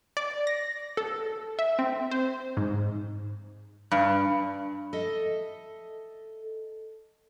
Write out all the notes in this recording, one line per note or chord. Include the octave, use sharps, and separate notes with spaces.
D5
A#6
A4
E5
C4
C5
G#2
G2
A4 D#5 E5